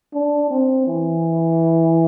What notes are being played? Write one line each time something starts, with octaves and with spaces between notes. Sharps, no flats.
D4
C4
E3